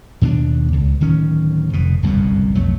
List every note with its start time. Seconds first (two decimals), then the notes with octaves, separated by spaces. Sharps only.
0.22 D#2 B2 C4 D4
0.72 C#2
1.01 D1 D#3 C#4
1.73 F1 B2
2.03 G1 C2 F#2 B2
2.55 B1 F2 F#3 A3